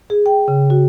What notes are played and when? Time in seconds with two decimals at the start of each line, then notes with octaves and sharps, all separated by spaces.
0.10 G#4
0.26 G5
0.48 C#3
0.70 F#4